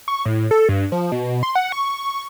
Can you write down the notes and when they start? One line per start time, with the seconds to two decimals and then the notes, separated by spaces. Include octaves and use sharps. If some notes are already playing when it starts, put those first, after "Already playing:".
0.08 C#6
0.25 A2
0.51 A4
0.69 G2
0.92 F3
1.12 B2
1.43 C6
1.55 F#5
1.72 C#6